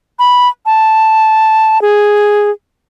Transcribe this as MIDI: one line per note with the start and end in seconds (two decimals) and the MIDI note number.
0.19 0.48 83
0.66 1.80 81
1.82 2.51 68